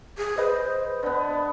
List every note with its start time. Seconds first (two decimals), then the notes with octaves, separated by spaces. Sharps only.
0.18 G#4
0.38 B4 C5 D#5
1.03 D3 B3